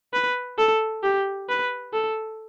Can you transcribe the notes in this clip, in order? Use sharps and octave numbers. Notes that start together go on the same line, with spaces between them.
B4
A4
G4
B4
A4